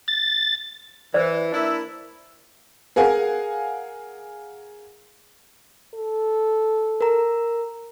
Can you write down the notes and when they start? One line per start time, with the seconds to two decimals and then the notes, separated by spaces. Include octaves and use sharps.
0.08 A6
1.14 E3 C5 D5
1.53 A#3 D4 E4
2.96 G#4 A#4 F5 F#5 G#5
5.94 A4
7.01 A#4 A#5